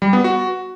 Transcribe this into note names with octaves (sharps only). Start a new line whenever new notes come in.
G3
B3
F#4